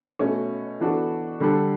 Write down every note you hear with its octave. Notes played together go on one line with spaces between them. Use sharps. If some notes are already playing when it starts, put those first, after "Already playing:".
B2 A3 C#4
E3 B3 D4 F#4 A4
D3 G3 D4 A4